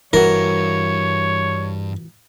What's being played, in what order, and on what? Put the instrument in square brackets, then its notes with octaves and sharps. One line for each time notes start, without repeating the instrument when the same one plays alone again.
[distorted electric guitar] G2 [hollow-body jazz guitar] E3 F#4 [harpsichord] A#4 [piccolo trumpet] C#5